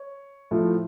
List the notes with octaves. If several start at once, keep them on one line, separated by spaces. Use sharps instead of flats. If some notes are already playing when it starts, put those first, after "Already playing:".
Already playing: C#5
A2 F3 A3